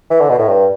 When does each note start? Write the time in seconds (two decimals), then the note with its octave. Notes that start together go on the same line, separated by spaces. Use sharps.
0.10 E3
0.20 D3
0.29 B2
0.39 A2
0.48 G2